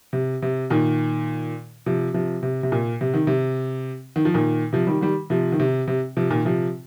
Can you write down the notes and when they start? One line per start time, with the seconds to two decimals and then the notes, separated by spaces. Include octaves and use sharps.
0.13 C3
0.42 C3
0.70 A#2 D#3
1.86 C3 F3
2.14 C3 F3
2.43 C3
2.63 C3
2.72 A#2
3.01 C3
3.14 D#3
3.27 C3
4.16 D#3
4.25 F3
4.34 A#2 D#3
4.73 C3 F3
4.87 D#3 G3
5.01 D#3 G3
5.30 C3 F3
5.52 D#3
5.60 C3
5.88 C3
6.17 C3 F3
6.31 A#2 D#3
6.45 C3 F3